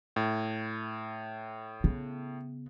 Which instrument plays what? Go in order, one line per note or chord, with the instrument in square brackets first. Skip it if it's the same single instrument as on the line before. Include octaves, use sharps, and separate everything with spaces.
[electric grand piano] A2
[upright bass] C#3 B3